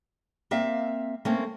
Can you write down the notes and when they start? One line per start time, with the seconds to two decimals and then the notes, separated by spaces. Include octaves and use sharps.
0.51 A#3 C4 E5 F5
1.25 A3 A#3 C4 C#4